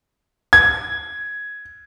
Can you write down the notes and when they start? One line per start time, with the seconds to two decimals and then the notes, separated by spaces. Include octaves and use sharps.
0.53 G#6